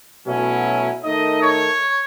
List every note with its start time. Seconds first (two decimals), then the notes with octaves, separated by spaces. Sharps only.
0.25 B2 F#3 A3 C#4 E4
1.04 D#3 A3 D#4 D#5
1.43 C#5